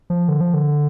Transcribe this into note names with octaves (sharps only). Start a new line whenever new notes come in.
F3
D3
F3
D3